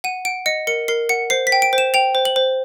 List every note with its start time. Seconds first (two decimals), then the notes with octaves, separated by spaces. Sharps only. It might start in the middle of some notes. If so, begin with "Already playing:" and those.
0.04 F#5 D#7
0.25 F#5 D7
0.46 D#5 C#7
0.67 A#4 C#7
0.88 A#4 C7
1.09 F#5 C#7
1.30 C5 C7
1.47 B6
1.52 G5
1.62 D7
1.73 C5
1.78 E7
1.94 G5 F7
2.15 C5
2.25 F#7
2.36 C5